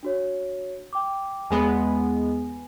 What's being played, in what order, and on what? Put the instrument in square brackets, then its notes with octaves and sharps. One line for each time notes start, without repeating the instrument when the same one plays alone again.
[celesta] D4 F#4 C#5
G5 D6
[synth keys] E2 G#3 B3 [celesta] G#5